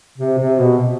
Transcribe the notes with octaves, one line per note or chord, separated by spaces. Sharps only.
C3
C3
B2